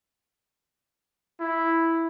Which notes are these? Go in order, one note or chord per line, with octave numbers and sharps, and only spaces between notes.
E4